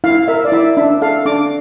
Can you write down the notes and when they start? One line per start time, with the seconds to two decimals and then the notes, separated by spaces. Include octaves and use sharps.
0.04 E4 F5
0.28 A#4 E5
0.45 D5
0.52 E4 E5
0.77 D4 E5
1.02 A4 F5
1.25 D4 D6